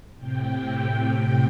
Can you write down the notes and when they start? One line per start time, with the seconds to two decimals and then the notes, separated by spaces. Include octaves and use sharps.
0.18 A2 C3 G5